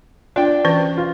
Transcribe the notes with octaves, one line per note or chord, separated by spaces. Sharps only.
D4 F4 G5
E3 C#4 B4
F4